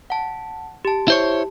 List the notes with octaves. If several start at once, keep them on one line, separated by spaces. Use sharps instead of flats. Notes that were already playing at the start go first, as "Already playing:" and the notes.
F#5 A5
G4 A5
E4 C5 C#5